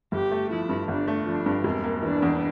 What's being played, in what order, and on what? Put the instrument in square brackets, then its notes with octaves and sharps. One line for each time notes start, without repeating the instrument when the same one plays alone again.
[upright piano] G1 [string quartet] G4
[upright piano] A3
[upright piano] F3 [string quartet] E4
[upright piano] G2
[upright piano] G1 [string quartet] D4
[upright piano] A3
[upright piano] F3 [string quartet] D4
[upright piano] G2
[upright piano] E1 [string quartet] C4
[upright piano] A#3
[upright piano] E3 [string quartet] D4
[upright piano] E2